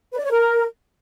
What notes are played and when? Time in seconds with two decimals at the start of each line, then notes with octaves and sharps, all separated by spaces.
0.12 B4
0.18 D5
0.24 C#5
0.31 A#4